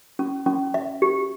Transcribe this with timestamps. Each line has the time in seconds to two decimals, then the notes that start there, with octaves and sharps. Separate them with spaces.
0.19 C#4
0.46 C#4
0.74 E5
1.02 G4